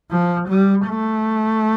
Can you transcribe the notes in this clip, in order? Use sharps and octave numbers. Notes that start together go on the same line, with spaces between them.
F3
G3
A3